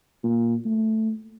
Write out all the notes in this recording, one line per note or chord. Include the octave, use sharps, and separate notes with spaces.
A#2
A3